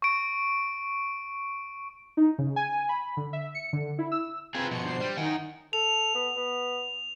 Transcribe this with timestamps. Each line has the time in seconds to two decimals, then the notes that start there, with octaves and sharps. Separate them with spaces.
0.02 C#6 D7
2.17 D#4
2.38 C#3
2.56 G#5
2.89 B5
3.17 D3
3.33 E5
3.55 C#7
3.73 D3
3.98 E4
4.12 E6
4.55 C4 F4 G#4 B4 A#5
4.71 B2 F3 C#7
4.84 D4 C5 C7
5.01 G3
5.17 D#3 D#4 F#5 G#5
5.73 A4 F7
6.15 B3
6.36 B3